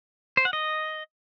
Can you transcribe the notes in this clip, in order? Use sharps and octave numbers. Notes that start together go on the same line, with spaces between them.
C5
F#5
D#5